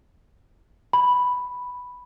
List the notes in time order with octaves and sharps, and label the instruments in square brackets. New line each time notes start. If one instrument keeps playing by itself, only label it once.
[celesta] B5